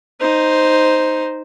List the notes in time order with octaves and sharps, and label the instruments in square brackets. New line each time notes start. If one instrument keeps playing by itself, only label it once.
[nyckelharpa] D#4 C5